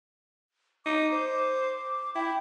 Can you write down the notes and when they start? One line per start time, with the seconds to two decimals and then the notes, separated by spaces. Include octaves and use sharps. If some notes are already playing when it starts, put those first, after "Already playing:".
0.86 D#4 D6
1.12 C5
2.15 E4 G5